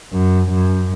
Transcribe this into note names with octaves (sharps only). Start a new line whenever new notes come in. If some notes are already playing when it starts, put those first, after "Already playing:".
F#2
F#2